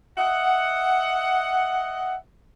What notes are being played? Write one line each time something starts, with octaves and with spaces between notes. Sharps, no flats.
D#5 E5 F#5